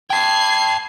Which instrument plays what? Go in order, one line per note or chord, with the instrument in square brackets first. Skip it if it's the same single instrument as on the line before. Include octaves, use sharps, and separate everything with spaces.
[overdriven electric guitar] G5 A5 [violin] G#6 C7